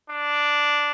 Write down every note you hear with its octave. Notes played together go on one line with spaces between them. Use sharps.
D4